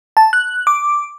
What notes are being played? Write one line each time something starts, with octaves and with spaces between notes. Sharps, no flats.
A5
F#6
D6